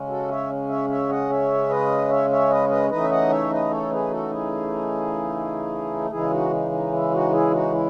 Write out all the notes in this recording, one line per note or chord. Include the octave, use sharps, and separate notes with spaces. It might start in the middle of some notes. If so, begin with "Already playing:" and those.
Already playing: C#3 G#3 C#4
F#4 A4
C#5 E5
C#5 E5
C#5 E5
D#5 F#5
C#5 E5
B4 D#5
C#5 E5
C#5 E5
B4 D#5
B4 D#5
C#3 E3 A3 D#4 B4 D#5
E5
D#5 F#5
C#5 E5
B4 D#5
A4 C#5
G#4 B4
F#4 A4
E4 G#4
C#3 E3 G#3 D#4 E4 G#4
D#4 F#4
D#4
D#4
E4
D#4 F#4
E4 G#4
D#4 F#4
E4